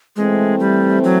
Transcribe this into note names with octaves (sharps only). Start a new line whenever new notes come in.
E3 G#3 A3 C4
G3
F#3